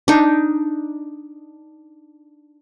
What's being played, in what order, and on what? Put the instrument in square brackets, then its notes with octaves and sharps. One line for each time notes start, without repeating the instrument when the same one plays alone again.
[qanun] D4 D#4